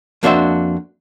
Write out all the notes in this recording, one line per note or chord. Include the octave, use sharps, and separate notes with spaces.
F2 A#3 D4 F#4 C5 E5